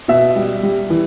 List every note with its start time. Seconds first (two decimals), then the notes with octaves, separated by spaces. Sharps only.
0.08 B2 E5
0.36 G3
0.63 G3
0.90 E3